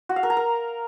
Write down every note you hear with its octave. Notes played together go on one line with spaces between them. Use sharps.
F#4
F5
A#4
A#5
A#4